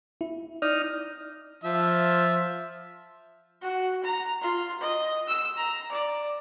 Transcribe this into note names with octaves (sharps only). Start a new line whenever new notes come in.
E4
D#4 D5 F6
F3 E5
F#4
A#5
F4
D#5
E6
A#5
D5